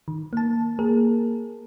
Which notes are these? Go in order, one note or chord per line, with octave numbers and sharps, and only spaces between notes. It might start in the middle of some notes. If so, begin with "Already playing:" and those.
D#3
A#3 A5
A#3 G#4 A#4